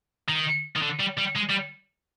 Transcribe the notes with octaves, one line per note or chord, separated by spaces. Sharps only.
D#3
D#3
D3
G3
G3
G#3
G3